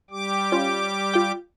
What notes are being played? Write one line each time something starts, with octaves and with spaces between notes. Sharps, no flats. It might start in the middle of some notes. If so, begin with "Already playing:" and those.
G3 G4 D6
C#4 F4
F4 G5